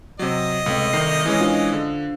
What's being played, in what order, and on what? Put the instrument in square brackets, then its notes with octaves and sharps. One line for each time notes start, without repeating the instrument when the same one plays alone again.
[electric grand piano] C3 F#3 [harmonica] D#5
[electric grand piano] C#2 [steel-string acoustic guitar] C3 A3
[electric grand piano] C2 D#3 C7
E3 G#3 C#4
[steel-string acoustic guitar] D4 F4 C5
[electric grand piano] D3